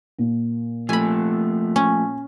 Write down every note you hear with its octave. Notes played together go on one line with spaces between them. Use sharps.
A#2
F3 A3 G#5 B5
C#4